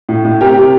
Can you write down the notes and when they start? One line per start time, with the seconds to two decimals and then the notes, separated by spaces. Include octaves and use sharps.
0.09 A2
0.25 A2
0.41 C3 G4 A#4
0.57 C3